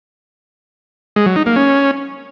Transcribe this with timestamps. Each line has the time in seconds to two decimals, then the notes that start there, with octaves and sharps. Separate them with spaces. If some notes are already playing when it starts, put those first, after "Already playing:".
1.16 G#3
1.26 F#3
1.36 D#4
1.46 A#3
1.56 C#4